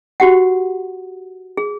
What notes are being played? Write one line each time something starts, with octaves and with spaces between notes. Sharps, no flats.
F#4 G4 F#5
G#4